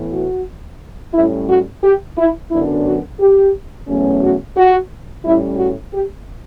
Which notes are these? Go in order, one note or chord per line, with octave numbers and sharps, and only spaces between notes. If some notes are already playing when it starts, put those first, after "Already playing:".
Already playing: A2 E3 B3
F#4
A2 G3 C#4 E4
F#4
G4
E4
F#2 D3 F#3 B3 D4 E4
F#4
G4
E2 B2 F#3 A3 C#4
F#4
F#4
A2 G3 C#4 E4
F#4
G4